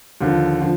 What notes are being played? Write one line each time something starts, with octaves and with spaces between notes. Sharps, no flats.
D#2 D3 F3
D3 F3